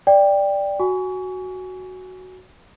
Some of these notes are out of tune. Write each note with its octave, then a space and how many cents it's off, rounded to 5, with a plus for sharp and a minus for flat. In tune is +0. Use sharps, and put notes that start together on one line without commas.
D5 +0 G5 +15
F#4 +0 G#5 +0 C#6 +30